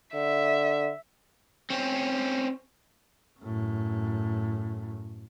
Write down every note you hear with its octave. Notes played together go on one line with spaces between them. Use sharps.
D3 E5
C4 C#4
F#2 A2